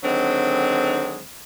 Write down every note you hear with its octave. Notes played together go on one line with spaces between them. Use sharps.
D3 D#3 F#3 G#3 C4